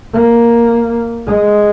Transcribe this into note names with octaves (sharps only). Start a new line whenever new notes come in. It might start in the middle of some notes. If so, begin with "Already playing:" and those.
A#3
G#3